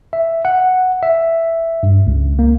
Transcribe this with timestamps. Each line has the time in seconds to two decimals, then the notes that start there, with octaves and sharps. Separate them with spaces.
0.13 E5
0.45 F#5
1.03 E5
1.83 G2
2.07 C#2
2.39 A#3